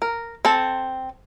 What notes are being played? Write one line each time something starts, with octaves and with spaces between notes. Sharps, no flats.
A#4
C4 A4 A5